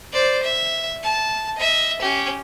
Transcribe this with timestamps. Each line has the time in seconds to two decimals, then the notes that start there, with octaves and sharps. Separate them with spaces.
0.12 C5 D5
0.43 E5
1.03 A5
1.57 D#5 E5
2.02 C#4 G4